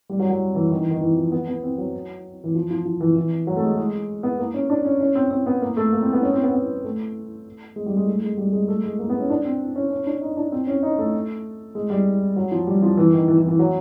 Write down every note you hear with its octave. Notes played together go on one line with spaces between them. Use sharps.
G3
F#3
F#3
E3
D#3
E3
D#3
E3
F3
B3
B3
C4
F#3
E3
F3
F3
F3
E3
E3
F#3
A3
G#3
G#3
B3
A#3
C#4
D4
C#4
C#4
C4
C4
B3
A#3
A3
A#3
C4
B3
C#4
C4
B3
B3
A3
G#3
G3
G#3
A3
G#3
G3
G#3
A3
G#3
A#3
B3
C#4
D4
C4
C#4
C#4
D4
D#4
D4
C4
C#4
D#4
A3
G#3
G3
F#3
F3
G3
F3
E3
D#3
E3
E3
E3
F#3